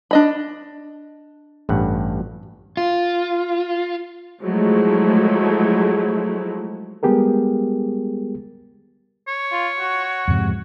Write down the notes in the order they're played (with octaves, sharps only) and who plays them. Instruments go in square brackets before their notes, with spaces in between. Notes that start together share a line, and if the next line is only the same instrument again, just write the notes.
[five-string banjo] D4 D#5 B5
[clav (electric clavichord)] A1 G2 F#5
[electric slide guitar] F4
[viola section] F3 F#3 G#3 A3 E4
[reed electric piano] G3 G#3 B3 G4 G#4 A#4
[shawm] C#5
[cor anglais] F4
F#4
[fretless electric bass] F2 G#2 C3